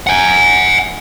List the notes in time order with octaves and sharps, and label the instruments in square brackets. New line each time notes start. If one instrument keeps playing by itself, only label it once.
[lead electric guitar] F#5 G#5